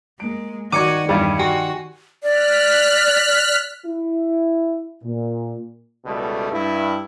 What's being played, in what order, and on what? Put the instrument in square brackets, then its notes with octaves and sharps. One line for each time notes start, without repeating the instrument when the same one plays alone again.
[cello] G#3 [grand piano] A#3 D7
[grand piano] D#3 D5 [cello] F#4 [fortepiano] D6 [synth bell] G#6 C#7 D#7
[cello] E2 [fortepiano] G2 G3
[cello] F#4 [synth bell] G4 G5 G#5
[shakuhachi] D5 [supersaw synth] F6 F#6 B6
[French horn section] E4
A#2
[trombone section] C#2 B2 G3 A3
G2 E4